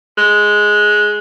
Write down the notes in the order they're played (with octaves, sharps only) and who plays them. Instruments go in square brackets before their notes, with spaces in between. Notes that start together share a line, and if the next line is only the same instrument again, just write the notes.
[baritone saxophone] G#3